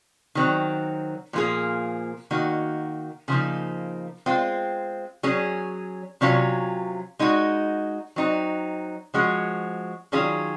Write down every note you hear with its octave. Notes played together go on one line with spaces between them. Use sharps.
D#3 F#3 C4
A#2 F3 A#3 F4 G#4
D#3 A#3 D#4 F#4
C#3 F3 A#3 D#4
G#3 C4 F4
F#3 C#4 G#4
C3 F#3 C#4 F4
G#3 D#4 F#4
F#3 C4 D#4
F3 G#3 C#4 F#4
D#3 F#3 C#4 F4 G#4